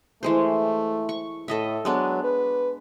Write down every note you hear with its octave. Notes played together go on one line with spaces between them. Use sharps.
E3 G#3 A3 C5
C#6
A2 A4 D#5 E5
F#3 G#3 B3 D4
B4